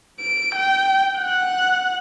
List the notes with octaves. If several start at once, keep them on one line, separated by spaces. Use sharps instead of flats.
D7
G5
F#5